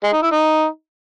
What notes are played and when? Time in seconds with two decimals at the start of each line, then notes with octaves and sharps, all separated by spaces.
0.03 G#3
0.13 D#4
0.22 E4
0.32 D#4